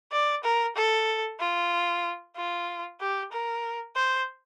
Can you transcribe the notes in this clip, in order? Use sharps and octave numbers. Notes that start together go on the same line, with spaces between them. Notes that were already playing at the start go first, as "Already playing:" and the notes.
D5
A#4
A4
F4
F4
G4
A#4
C5